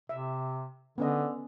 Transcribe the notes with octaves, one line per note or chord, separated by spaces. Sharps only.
C3 E5
D3 B3 C#4 D#5